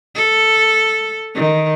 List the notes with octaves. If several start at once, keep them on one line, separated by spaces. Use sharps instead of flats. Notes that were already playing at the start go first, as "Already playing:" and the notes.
A4
D#3